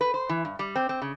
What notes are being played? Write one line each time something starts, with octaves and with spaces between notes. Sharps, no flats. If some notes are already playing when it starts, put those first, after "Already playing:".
B4
C5
E3
G2
G3
C4
C4
C#3